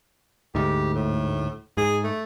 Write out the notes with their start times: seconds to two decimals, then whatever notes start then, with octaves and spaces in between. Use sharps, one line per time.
0.55 D2 G#2 G4
0.94 A2
1.77 G#2 G#4
2.04 A3